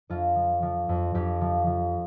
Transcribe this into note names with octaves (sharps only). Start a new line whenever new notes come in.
F2 F4
F3
F3
F2
F2 G4
F3
F3